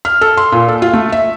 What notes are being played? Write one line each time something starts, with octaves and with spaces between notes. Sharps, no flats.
F6
A4
C6
A#2
A4
F4
A3
E5